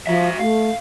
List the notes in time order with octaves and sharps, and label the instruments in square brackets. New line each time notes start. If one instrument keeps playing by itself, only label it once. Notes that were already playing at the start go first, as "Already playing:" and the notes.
[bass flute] F3 [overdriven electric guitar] F#4 E5
[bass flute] A3 [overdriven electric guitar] F5